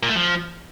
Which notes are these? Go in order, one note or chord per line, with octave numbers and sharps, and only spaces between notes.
A#2
A3
F3